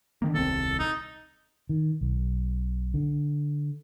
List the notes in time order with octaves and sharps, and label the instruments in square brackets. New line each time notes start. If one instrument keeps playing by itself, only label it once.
[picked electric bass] D3 D#3 A#3
[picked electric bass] D#1 C2 C4 [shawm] A4
[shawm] D#4
[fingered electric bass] D#3
B1
D3